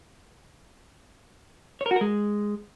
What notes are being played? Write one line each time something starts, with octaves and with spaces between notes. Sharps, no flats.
C#5
A#4
F#4
A#4
G#3